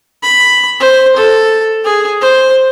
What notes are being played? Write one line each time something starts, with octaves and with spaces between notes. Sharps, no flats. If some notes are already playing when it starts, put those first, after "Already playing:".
B5
C5
A4
G#4
C5